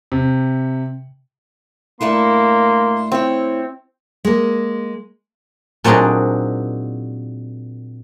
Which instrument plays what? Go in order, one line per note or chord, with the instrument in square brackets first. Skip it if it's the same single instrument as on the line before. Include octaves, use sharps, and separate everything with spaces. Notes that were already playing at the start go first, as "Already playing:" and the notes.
[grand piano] C3
[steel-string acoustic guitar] G2 A3 E4 [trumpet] A#3 [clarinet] C6
[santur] C4 [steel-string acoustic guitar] E4 C#5
[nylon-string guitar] G#3 A#3
[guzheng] A#2 F#3 C4 D4 D#4 G#4